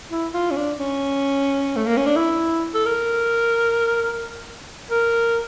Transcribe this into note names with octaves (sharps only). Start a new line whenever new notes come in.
E4
F4
C#4
D4
C#4
A3
A#3
C#4
D4
E4
A4
A#4
A#4